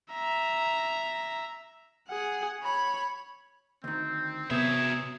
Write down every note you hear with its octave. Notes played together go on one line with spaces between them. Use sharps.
E5 A#5
G#4 F#5
C#5 B5
D2 D#3 C4
C3 F#3 B3 G#4 E5